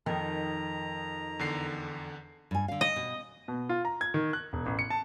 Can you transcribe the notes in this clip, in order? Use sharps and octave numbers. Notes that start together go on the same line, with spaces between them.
F2 D#3 A#5
E2 D3 C7
G2 G#5
D3 F5
D#5
B2
B2
F4
A#5
G#6
D#3
F#6
E1
A1
C#7
A5